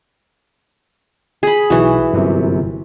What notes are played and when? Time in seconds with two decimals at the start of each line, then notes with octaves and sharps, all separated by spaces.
1.43 G#4 B5
1.70 B1 E3 F#4
2.13 G1 F#2 C3